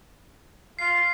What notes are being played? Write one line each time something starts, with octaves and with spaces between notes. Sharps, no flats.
F4 C7